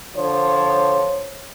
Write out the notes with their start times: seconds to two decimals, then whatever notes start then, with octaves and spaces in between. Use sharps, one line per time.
0.16 D3 F3 C#5